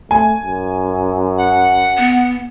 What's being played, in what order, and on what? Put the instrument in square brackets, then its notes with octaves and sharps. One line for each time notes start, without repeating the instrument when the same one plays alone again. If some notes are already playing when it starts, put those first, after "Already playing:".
[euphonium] A3 [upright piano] G#5
[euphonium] F#2
[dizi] F#5
[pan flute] B3